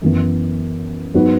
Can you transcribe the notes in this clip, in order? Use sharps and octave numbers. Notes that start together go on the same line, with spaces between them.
F#2 E3 B3
G#2 F#3 B3 F#4 B4